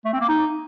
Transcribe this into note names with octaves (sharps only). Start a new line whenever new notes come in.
A3
C4
A#3
D#4